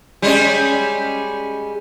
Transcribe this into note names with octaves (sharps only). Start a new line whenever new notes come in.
G3 G#3 C#4